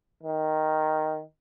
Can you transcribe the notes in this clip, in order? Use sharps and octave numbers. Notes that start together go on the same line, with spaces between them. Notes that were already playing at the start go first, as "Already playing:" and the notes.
D#3